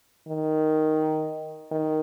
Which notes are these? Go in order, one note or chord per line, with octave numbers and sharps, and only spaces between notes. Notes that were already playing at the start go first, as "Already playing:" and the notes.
D#3
D#3